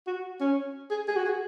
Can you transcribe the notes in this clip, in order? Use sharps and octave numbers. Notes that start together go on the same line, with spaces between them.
F#4
C#4
G#4
G#4
F#4
G#4